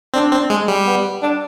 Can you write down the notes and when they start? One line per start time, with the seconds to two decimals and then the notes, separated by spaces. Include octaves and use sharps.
0.14 C4 D4
0.32 C4
0.50 G#3
0.68 G3
0.87 B3
1.22 D4